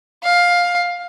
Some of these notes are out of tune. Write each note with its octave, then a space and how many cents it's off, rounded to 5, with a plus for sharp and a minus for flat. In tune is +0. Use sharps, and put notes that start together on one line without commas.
F5 +15